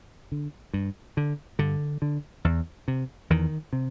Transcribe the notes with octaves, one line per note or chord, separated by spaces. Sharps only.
D3
G2
D3
G2 D3
D3
E2
C3
E2 D#3
C3